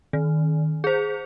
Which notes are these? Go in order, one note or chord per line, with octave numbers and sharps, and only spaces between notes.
D#3
G#4 C5